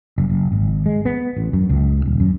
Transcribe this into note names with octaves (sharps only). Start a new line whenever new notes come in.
F#1
F#1
G#1
G#3
B3
A1
F#2
C#2
D#1
F#2